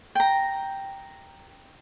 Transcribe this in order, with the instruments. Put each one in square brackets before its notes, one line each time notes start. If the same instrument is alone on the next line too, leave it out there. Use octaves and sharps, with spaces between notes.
[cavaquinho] G5 A#5